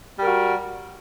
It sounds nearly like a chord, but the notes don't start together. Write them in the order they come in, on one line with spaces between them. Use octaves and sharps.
G3 A#4 F#4